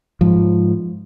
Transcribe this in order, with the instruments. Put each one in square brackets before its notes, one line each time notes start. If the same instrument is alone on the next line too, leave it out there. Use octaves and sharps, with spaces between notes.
[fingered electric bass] G#2 F3